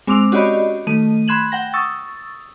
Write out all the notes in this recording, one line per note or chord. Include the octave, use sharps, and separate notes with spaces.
G#3 C4 C6 D6 E6 F7
C#4 F#4 G4 D5 D#5 B5
D#3 A3 D#7
B5 C6 F#6 G#6 E7 F#7
F#5 G5 A#6
C#6 D#6 E6 A6